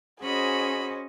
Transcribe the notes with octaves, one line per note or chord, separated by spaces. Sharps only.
C#4 F#4 G#4 C5 D#5 B5